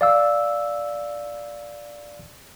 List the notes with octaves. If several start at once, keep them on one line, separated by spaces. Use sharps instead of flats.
D5 F5 E6